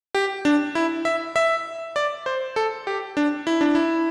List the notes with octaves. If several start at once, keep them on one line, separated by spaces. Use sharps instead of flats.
G4
D4
E4
E5
E5
D5
C5
A4
G4
D4
E4
D4
E4